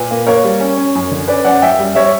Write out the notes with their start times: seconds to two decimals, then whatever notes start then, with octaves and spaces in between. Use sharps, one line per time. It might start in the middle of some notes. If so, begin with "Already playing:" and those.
Already playing: A#2 B4
0.11 A#3
0.27 A#3 A#4 C#5
0.44 G3
0.60 C#4
0.77 C#4
0.95 F#2
1.11 D3
1.28 C#4 B4 D5
1.45 F#2 D5 F#5
1.62 F#2 E5 G5
1.79 G3
1.95 G3 C#5 E5